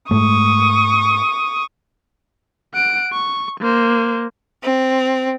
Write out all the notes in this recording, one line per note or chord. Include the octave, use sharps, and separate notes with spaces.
G#2 G#3 A3 C#6 D#6
F#5 D7
C#6
A#3 C5
C4